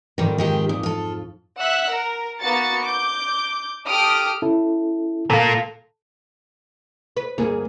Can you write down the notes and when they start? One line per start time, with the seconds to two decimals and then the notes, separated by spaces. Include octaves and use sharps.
0.18 F2 G#2 D#3 F3 G3
0.38 D#3 G#3 G4
0.69 A#2 D#6
0.83 F4 A4
1.58 E5 F#5 E6 F#6
1.89 A#4
2.41 A#3 B3 F#4 A6 C#7
2.83 D6 G6
3.88 G4 A4 D#6 F6 D7
4.42 C#4 E4 A4
5.30 A#2 A#3 A4
7.17 B4
7.38 D2 G2 A#3 G#4